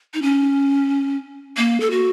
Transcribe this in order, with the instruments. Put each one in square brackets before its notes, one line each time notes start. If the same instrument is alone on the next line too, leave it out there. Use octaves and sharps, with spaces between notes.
[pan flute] D#4
C#4
A#3
A4
F#4